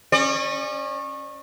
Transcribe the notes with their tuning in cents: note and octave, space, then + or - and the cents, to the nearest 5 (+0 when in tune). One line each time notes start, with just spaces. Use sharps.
C#4 -25 D5 +30